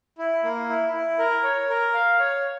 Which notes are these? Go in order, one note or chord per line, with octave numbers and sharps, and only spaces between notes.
E4
A#3
E4
E4
A#4
C#5
A#4
F5
C#5